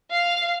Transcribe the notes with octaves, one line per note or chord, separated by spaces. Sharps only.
F5